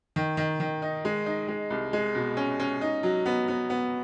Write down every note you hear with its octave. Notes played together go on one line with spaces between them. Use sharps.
D#3
D#3
D#3
D#4
G#3
D#4
G#3
C2
G#3
B2
C#4
C#4
D#4
F#3
B3
B3
B3